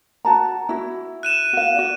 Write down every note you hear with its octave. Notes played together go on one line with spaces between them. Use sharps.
F#4 A5 A#5
E4 F#4
F#6 D#7 E7
F#4 F5
F#4 D5